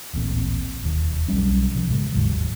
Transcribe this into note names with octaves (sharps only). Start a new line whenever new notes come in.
D1 A1 A#2 C4
E1 D#2
B1 F#3 G3 C#4
B2 F3
G#2 C#3 G#3
G#1 D#2 G#2 F#3